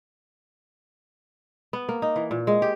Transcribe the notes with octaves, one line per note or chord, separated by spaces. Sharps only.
B3
A#3
D#4
E3
A#2
G#3
G4